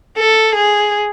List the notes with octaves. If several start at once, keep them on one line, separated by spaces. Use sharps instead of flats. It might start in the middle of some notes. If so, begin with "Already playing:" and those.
A4
G#4